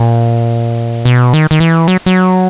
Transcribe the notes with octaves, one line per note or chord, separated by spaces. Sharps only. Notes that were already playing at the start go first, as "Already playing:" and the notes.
Already playing: A#2
B2
D#3
D#3
E3
F#3
F#3